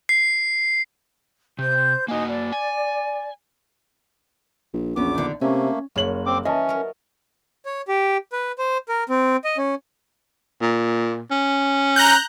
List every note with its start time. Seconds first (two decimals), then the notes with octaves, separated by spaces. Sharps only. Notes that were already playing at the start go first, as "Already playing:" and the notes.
0.09 C7
1.59 C3 C5 G6
2.08 A#3 D#4 F#4 G#5
2.28 D5
2.52 G#5
4.73 A#1
4.96 A#1 E2 B3 C#4 D6
5.15 D3 D#3
5.41 C3 A3 A#3 C#4
5.96 F#1 G3 A#3 C#5 F#7
6.26 C4 D6
6.45 E3 C#4 D#5 A5
6.69 F#3 A#4
7.65 C#5
7.88 G4
8.33 B4
8.59 C5
8.89 A#4
9.09 C4
9.44 D#5
9.58 C#4
10.61 A#2
11.31 C#4
11.96 A#5 F#6 G6